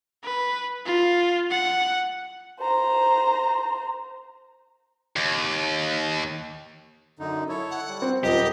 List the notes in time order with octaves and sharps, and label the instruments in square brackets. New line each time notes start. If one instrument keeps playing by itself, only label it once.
[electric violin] B4
F4
F#5
[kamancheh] C5 A#5
[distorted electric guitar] D#2
[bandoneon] F#2 D3 D#4
E4 A4 C#5
[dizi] F#5
[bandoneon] G3
[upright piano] C4
[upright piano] D#1 A#2 [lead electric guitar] G4 [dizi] D#5 [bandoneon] G5